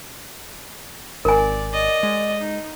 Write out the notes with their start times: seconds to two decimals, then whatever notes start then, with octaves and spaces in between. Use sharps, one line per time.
1.25 G#1 A#4 D5 G#5
1.72 D5 D#5
2.03 G#3
2.39 D#4